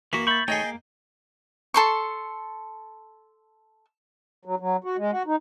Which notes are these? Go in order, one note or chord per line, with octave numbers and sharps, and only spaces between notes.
E3 A#3 F#4 B6
E5 B5 C#6 G6 A6
A3 D#4 G#4 C#5 D#5 G5
A#3
A4 C6 C#6
F#3
F#3
F#4
G#3
F#4
D#4